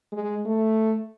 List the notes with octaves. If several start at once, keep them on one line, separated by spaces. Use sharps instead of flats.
G#3
A3